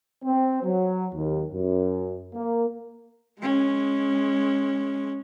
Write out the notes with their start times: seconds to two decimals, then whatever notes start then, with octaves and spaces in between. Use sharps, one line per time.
0.25 C4
0.63 F#3
1.14 D#2
1.52 F#2
2.34 A#3
3.40 G#3 C#4